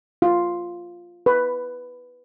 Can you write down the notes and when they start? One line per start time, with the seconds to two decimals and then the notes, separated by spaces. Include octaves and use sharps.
0.22 F4
1.26 B4